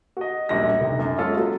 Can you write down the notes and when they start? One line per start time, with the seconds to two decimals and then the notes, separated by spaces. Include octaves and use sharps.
0.17 F#4 D#5
0.49 E1 A#1 G3 A#6
0.80 F1 C2
0.99 F#2
1.18 G#3 C#4 F4 A4
1.37 F#3